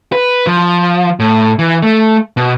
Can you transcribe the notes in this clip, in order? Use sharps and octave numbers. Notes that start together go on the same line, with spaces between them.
B4
F3
A2
E3
A3
B2